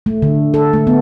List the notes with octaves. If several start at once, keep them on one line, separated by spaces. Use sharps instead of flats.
A3
D3
A4
A3
B3